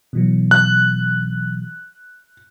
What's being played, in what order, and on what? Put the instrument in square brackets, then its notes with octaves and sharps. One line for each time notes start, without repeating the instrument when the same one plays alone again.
[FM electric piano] B2 E3 F#3
[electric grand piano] F#6